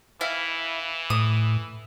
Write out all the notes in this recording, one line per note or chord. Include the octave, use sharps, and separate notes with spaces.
E3 E4 F5
A2 D#6